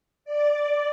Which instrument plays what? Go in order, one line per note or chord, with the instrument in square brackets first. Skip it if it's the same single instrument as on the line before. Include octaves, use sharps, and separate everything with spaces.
[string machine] D5